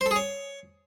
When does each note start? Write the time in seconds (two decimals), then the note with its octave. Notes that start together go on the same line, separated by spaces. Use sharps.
0.01 C5
0.06 A4
0.11 G#4
0.16 C#5